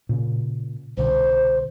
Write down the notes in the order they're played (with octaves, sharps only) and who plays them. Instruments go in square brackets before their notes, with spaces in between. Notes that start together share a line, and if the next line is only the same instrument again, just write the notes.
[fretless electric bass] A#2 C#3
[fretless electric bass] C2 B2 D3 [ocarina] C5